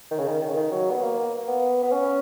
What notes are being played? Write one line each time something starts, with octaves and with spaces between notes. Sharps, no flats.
D#3
C#3
D#3
D#3
C#3
D#3
F#3
B3
A#3
B3
B3
C#4